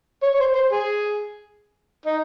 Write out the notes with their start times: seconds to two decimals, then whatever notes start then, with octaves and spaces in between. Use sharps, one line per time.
0.23 C#5
0.34 C#5
0.40 C5
0.55 C5
0.72 G#4
2.06 D#4